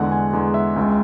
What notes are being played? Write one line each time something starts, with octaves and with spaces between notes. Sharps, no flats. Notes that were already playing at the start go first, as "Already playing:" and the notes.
Already playing: E2 D3 G#3 F#5
G#5
E2 D3 G#3
E5
C#2 C#3 G#3